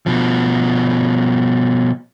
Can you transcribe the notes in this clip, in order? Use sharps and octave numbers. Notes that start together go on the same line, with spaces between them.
B2 F3